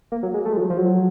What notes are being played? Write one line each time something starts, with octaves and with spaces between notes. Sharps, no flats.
A#3
F#3
G#3
A3
G#3
F3
F#3
F3
F#3